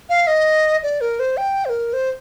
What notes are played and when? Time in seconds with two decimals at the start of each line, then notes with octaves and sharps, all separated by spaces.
0.09 F5
0.27 D#5
0.83 D5
1.01 A#4
1.20 C5
1.37 G5
1.65 C5
1.69 A#4
1.93 C5